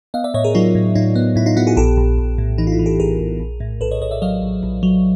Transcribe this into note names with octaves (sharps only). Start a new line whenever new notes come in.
B3 D#5 F5
D5 E5
A2 C#5 D#5
G#4 A#4
F#3 D#4 F4
A2
A2 D#4 F4
B3
A2 E4
D#4 F4
B3 E4 F#4
F#4 G#4
A#1 G4 A4
A#1
A#1
A2
E3 D#4
F4
E4
E3
G4 A4
A#1 G#4 A#4
A#1
A#1
A2
A#1 A4 B4
C#5 D#5
A#1 C#5 D#5
D5 E5
F#3 D#5 F5
A#1
A#1
F#3